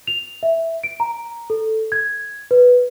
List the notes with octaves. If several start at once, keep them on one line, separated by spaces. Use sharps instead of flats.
F7
E5
D7
A#5
A4
G#6
B4